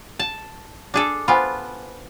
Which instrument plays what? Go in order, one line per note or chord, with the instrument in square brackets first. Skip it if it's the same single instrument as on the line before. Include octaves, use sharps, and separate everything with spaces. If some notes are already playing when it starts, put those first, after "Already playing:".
[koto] A5
D4 G#4 A4
[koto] B3 F4 [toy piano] C5 G#5 B5